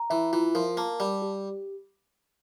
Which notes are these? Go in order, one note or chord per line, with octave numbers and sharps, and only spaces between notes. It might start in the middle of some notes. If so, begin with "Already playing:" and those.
Already playing: A#5
E3 E5
E3 F4
F3 A#4
A#3 A5
G3 D5
G4